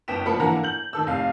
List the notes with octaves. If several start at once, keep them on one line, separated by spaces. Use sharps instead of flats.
F#1 B3 G5 B6 E7
F3 A#3 B5 C#7
D3 E3 A#3 F#5 A#5
G6 F#7
D#3 A4 E6
F1 F5